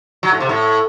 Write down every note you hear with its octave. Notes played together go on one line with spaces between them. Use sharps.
F#3
A2
C3
A2